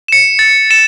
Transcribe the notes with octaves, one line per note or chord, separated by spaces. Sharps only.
C#7 E7
A6
C#7 E7